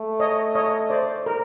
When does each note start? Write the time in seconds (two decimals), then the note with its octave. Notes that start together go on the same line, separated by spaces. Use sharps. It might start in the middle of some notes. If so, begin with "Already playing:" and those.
Already playing: A3
0.20 C#5 D#5
0.55 C#5 D#5
0.90 C5 D5
1.26 A#4